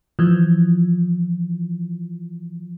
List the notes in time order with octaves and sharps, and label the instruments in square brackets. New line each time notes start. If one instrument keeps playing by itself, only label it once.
[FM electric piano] E3 F3